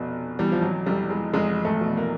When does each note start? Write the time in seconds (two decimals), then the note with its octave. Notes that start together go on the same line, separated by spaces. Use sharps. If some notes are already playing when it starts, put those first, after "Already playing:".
Already playing: F1 B2
0.39 E2 G3
0.52 F3
0.62 F#3
0.86 F1 G3
1.10 G#3
1.33 F1 G#3
1.65 A3
1.81 B2
1.97 A#3